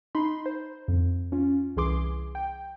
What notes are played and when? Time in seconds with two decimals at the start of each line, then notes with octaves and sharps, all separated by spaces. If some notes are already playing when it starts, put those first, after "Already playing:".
0.15 D#4 B5 C6
0.46 C5
0.88 F2
1.32 C#4 F4
1.76 C2 E3 G#4 C6 D6
2.35 G5